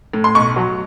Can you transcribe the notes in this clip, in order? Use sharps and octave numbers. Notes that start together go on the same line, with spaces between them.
A2
C6
B1 C#6
F#3